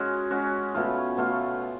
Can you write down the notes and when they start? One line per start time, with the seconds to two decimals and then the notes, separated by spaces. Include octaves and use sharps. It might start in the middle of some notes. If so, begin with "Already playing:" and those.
Already playing: G#3 C#4 F#4
0.31 G#3 C#4 F#4
0.74 B2 A3 F4
1.17 B2 A3 F4